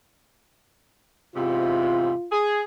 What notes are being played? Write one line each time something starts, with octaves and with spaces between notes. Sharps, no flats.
E2 G#2 C3 F4
G#4